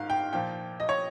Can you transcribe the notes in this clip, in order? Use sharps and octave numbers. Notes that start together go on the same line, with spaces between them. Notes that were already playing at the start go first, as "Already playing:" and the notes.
Already playing: G#2 D#3 F5
G5
A#2 F3 G5
D#5
C#5